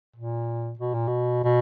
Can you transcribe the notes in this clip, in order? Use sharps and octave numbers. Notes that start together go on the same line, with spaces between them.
A#2
B2
A#2
B2
B2